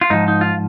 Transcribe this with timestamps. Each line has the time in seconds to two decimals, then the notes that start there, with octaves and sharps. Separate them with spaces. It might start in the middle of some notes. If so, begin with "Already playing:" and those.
0.01 F4
0.10 G#2 F3 D#4
0.28 D#4
0.41 F4